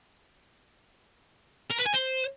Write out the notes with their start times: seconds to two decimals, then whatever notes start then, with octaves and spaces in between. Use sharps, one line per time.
1.71 A#4
1.79 B4
1.86 G#5
1.94 C5